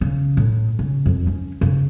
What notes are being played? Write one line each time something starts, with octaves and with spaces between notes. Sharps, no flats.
C#3
A2
C#3
F2
C#4
C#3